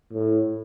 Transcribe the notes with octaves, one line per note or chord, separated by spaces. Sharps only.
A2